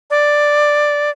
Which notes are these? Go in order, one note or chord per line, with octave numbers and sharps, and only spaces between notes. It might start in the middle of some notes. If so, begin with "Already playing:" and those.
D5